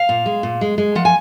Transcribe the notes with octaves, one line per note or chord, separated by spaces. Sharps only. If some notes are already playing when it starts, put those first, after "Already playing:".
Already playing: F5
A#2
G#3
A#2
G#3
G#3
F3 F#5
G#5